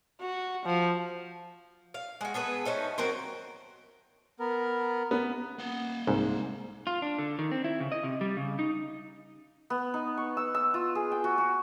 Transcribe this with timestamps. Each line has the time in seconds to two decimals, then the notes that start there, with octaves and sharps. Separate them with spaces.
0.21 F#4
0.66 F3
1.94 F5
2.21 G#3 F#4
2.34 B3 G#4 A4 B4
2.65 A3 C#4 D#4 C5
2.98 F#3 C4 A#4 C5
4.40 B3 A#4
5.11 B3
5.59 A#3 F#5
6.07 C2 G#2
6.87 F4
7.02 D4
7.18 D3
7.39 D#3
7.51 C4
7.64 E4
7.80 C#3
7.92 D#5
8.03 C3
8.21 G3
8.37 C#3
8.59 D#4
9.70 B3
9.94 D#4
10.17 C#6
10.37 E6
10.54 E6
10.74 F4
10.95 G#4
11.11 G5
11.24 F#4
11.38 F#4